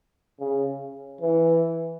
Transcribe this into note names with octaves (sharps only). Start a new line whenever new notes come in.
C#3
E3